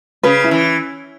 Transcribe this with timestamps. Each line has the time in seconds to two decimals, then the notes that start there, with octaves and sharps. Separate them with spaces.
0.23 C#3 B4
0.44 E4
0.51 E3